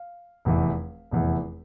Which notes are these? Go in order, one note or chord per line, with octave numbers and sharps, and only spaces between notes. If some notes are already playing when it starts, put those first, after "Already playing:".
Already playing: F5
F1 E2 E3
F1 E2 E3